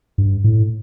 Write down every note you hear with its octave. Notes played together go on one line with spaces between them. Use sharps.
G2
A2